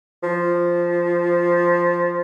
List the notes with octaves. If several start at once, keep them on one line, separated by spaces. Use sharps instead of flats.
F3